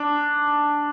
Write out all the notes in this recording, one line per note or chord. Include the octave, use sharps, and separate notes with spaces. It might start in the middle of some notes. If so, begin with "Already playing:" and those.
Already playing: D4